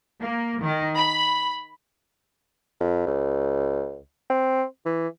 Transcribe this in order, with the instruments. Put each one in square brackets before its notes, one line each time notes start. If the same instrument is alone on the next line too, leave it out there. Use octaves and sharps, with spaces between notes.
[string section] A#3
D#3
B5
[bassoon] F2
C#2
C4
E3